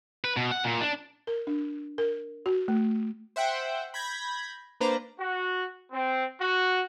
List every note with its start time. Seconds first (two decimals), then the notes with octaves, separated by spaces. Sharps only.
0.24 B4
0.37 B2
0.51 F#5
0.64 A#2
0.81 D4
1.27 A#4
1.47 D4
1.98 A#4
2.46 F#4
2.68 A3
3.36 C5 E5 F#5 G5
3.94 B5 G6 G#6 A#6 B6
4.80 A#3 D4 B4 C5 D5 A#5
5.19 F#4
5.91 C4
6.40 F#4